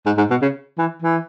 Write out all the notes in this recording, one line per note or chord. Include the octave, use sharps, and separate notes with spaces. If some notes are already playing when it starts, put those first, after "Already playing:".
G#2
G#2
B2
C#3
E3
E3